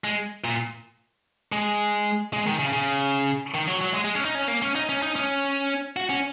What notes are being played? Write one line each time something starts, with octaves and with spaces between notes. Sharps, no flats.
G#3
A#2
G#3
G#3
D#3
C#3
C#3
D#3
F#3
F#3
G#3
G#3
C#4
D#4
C#4
A#3
C#4
D#4
C#4
D#4
C#4
F#4
C#4